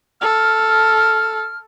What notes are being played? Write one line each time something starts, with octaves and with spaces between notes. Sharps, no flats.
A4 F6